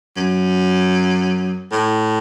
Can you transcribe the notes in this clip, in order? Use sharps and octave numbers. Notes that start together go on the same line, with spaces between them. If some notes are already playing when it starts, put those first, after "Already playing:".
F#2
A2